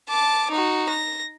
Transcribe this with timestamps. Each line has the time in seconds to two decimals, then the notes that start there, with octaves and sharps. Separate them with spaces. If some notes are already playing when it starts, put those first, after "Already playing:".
0.10 A5 D6
0.51 D#4 F#4
0.89 A#6